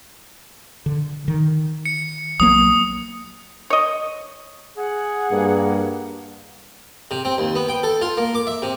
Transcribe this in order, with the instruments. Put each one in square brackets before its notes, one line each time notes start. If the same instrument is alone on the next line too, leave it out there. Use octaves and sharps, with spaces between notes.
[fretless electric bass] D3
D#3
[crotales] C#7
[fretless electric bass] A#1 F#3 A#3 [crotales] D#6
[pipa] C#5 D#5
[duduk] G#4 [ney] F#5
[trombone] G2 [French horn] A#3
[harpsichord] C3
C4
D#2
B3
G5
A4
F4
A#3
D6
E5
C3